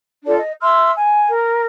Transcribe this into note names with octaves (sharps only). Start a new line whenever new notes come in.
D4 F4 A4 D5
D#5
E5 C6 E6 F6
G#5
A#4